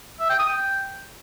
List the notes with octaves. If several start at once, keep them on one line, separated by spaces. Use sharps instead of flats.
E5
G5
D#6
G5